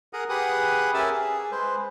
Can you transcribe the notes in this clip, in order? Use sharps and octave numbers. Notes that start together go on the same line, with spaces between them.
G#4 A#4 F#5 A#5 D#6
G4 G#4 B4 F#5 D#6
C#4 G4 A#4 E5 G#5 A5
G#4
G#3 B4 C5